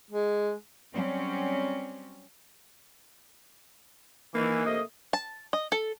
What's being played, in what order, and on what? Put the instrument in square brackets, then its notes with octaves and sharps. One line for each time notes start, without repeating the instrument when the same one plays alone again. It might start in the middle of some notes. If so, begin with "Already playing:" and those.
[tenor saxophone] G#3
[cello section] F#3 G3 C4 C#4
[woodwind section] D#3 E3 [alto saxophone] A#3
[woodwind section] C3 A3 D#5
[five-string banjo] A5
D#5
A4